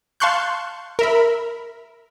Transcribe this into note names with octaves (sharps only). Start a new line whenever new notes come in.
F5 A5 C6 C#6 F#6 G6
A#4 E5 B5